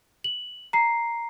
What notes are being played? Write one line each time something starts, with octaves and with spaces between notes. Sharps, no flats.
F#7
A#5 C7